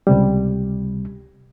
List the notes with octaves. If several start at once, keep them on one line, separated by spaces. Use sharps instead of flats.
C#2 C3 G3